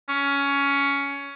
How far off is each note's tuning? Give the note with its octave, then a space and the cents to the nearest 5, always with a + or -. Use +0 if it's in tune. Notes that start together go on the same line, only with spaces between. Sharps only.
C#4 +15